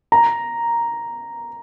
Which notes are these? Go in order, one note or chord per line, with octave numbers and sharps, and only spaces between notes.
A#5